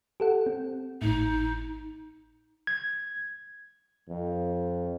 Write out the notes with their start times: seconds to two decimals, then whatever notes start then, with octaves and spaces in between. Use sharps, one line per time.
0.20 G4 A4 F#5
0.46 C4
1.02 G#1 A2 D#4
2.67 G#6
4.09 F2